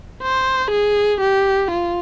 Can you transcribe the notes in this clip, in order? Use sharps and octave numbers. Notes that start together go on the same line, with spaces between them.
C5
G#4
G4
F4